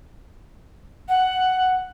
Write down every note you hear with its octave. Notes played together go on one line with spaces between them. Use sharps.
F#5